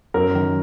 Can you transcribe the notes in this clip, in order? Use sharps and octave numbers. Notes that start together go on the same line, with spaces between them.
F#2 A#4
D#3